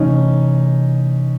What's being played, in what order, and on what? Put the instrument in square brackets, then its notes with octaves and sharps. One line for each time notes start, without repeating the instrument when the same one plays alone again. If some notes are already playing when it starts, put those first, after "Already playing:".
Already playing: [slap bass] C3 E3 A3 [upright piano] C#4 D#4